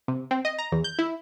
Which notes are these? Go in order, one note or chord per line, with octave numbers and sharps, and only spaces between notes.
C3
C4
D#5
A#5
E2
G6
E4